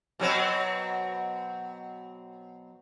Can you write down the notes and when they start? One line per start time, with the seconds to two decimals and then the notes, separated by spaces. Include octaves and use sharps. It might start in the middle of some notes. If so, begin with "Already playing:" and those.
0.20 B2 F#3 C4